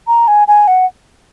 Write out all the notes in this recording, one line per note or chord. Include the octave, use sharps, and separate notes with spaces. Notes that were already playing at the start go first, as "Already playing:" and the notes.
A#5
G#5
G#5
F#5